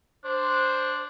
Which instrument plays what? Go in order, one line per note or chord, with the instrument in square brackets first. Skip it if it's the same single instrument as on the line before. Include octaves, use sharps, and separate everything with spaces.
[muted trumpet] D4 [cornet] C5